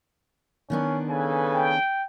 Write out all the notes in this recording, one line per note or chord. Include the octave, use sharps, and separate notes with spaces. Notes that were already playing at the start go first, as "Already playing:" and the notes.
D#3 B3 C#4 D4
C#3 A4 B4 G#5
G5